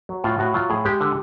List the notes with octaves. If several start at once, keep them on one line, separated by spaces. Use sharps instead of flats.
F#3
A2 F4
A2 F#4
F#3 F4
A2 G#4
G#3 G4
D3